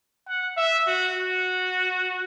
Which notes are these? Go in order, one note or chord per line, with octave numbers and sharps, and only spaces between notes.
F#5
E5
F#4
F#4